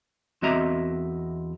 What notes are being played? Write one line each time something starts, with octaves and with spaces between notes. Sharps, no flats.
E2 C4 F#4 D#5 E5 A#5